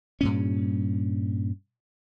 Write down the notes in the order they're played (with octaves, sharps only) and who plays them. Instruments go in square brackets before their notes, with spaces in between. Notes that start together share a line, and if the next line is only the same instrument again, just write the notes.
[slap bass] G2 A#2 C#4